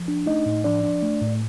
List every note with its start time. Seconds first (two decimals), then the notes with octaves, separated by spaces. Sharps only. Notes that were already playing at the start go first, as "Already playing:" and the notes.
Already playing: F3
0.08 D4
0.26 A3 D#4 D#5
0.46 A2
0.64 F3 D4 D5
0.83 D4
1.03 A3
1.22 A2